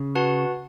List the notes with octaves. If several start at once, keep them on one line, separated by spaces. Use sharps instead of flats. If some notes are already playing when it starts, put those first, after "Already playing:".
Already playing: C#3
F#4 B4 F#5 A5